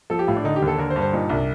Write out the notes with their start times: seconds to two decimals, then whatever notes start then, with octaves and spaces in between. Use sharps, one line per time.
0.10 F3 A4
0.19 G4
0.27 A2 F4
0.36 D4
0.44 D3 D#4
0.56 G4
0.62 D#2
0.67 A4
0.78 D3 A#4
0.90 C5
0.96 G2
1.02 C5
1.13 A#2 D#4
1.29 C2 D4